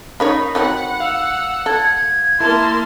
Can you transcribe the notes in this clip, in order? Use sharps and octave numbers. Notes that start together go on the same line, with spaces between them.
C#4 D#4 A#4 C#5 B5
D#3 F#3 C4 F#5
F5 E6
A4 G#6
A#3 E4 A5 C6